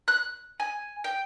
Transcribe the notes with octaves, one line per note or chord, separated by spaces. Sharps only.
F#6
G#5
G5